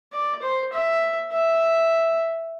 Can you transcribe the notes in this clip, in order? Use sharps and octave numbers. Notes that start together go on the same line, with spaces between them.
D5
C5
E5
E5